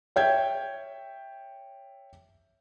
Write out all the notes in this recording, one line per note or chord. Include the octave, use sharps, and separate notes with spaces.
C#5 E5 G5 G6 G#6